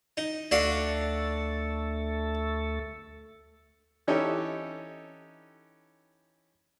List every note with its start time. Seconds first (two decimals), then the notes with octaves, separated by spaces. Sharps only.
0.17 D#4
0.51 D2 A3 D4 F#4 A4 F5
4.07 E3 C#4 D#4 G4 A4 E5